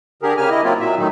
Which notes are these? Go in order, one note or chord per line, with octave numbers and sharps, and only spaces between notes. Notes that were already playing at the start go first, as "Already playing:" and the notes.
D3 G4 G#4 A#4
C#3 A#3 G4 G#5 F6
E4 D#5
F#3 A#3 C4 E4 F4
A#2 F#3 E5
A2 D#3 F#3 D#4